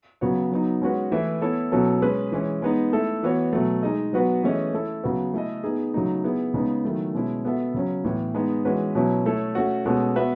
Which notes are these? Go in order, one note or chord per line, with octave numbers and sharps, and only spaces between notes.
C#3 F#3 B3 F#4 C#5
F#3 B3 D#4
G#3 C#4 F#4 B4
E3 A3 E4 B4 E5
B3 E4 A4 C#5
B2 F#3 C#4 E4 A4
G#3 C#4 G#4 B4
E3 G#3 C#4
G#3 B3 D#4
A3 E4 A4
E3 B3 F#4 C#5
B2 F#3 A3
G#3 D#4 G#4 D#5
F#3 B3 F#4 B4
E3 A3 C#4 G#4 D#5
A3 E4 A4
C#3 F#3 B3 F#4 B4
A3 E4 A4 D#5
B3 D#4 G#4
C#3 F#3 A3 D#4
B3 E4 G#4
C#3 G#3 B3 D#4
D#3 F#3 A3 E4
B2 G#3 C#4 E4
B3 F#4 A4 E5
C#3 F#3 C#4
A2 E3 B3
G#3 B3 D#4
E3 G#3 C#4 F#4 B4
B2 F#3 C#4 E4
A3 E4 A4 C#5
A3 C#4 F#4
B2 G#3 C#4 F#4 A4
B3 F#4 B4 E5